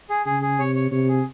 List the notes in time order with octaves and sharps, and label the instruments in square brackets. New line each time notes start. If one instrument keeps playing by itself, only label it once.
[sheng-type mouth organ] G#4
[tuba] C#3 [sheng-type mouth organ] G#4
[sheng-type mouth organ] G#4
[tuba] C3 [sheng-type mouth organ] C#5
[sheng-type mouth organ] C#5
[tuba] C3 [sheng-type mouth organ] C#5
[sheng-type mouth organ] G#4